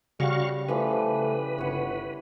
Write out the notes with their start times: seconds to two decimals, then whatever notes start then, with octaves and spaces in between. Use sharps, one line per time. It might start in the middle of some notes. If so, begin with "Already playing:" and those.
0.20 C#3 G3 F#4 F5 C#6
0.69 E3 F3 G3 A3 B4
1.58 G1 C#5 F#5